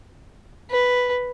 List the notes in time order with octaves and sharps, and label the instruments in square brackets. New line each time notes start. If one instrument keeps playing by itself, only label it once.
[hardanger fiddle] B4